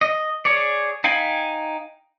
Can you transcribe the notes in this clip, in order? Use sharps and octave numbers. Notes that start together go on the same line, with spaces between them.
D#5
G#4 C#5 D5
D#4 F5 G5 G#5 B5